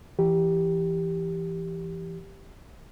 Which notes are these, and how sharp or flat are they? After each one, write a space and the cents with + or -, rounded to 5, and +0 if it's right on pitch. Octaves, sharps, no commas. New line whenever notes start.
E3 +15 G4 +0